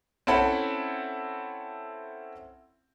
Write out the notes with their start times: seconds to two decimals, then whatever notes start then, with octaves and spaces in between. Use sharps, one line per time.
0.27 C4 C#4 E4 A4 F#5 B5